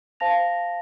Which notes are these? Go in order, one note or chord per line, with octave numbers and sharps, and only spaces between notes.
C5 F5 A5 A#6 F7